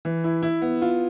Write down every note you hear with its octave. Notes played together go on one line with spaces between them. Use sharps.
E3
E4
E4
B3
F4